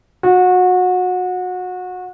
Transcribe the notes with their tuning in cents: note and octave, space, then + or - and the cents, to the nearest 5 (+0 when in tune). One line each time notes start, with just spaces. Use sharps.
F#4 -25